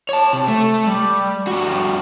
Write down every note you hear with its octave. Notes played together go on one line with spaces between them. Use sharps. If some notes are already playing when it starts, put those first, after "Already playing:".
C#5 A5
C3
A3
G3
G2 F#4